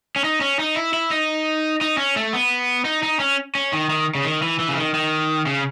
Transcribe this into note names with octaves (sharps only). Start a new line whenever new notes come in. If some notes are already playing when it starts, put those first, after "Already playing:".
C#4
D#4
C#4
D#4
E4
E4
D#4
D#4
C#4
A3
B3
D#4
D#4
C#4
C#4
D#3
D#3
C#3
D#3
E3
E3
C#3
D#3
D#3
C#3